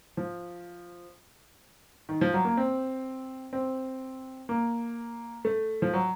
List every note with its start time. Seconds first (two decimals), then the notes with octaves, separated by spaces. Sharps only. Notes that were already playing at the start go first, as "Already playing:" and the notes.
0.17 F3
2.09 D#3
2.21 F3
2.34 F#3
2.45 A#3
2.57 C4
3.53 C4
4.49 A#3
5.45 A3
5.82 F3
5.94 F#3